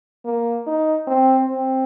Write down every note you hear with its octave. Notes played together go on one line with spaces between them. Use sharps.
A#3
D#4
C4
C4